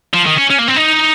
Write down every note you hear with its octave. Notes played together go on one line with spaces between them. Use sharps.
F3
D#3
C#4
C#4
A#3
C4
D#4